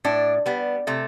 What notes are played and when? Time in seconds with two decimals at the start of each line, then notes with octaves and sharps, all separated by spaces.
0.05 A2 D4
0.46 G3 B3
0.87 C3 A3